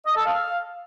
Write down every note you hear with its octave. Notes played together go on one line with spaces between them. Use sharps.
D#5
A4
F5